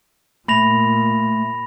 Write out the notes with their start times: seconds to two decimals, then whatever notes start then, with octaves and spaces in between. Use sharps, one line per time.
0.48 A#2 A3 B5 A#6 F7